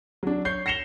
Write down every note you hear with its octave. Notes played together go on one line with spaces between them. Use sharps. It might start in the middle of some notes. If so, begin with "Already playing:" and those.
F#3 D4
C#5 G6 C7
A#6 C7 C#7 E7 F7 G7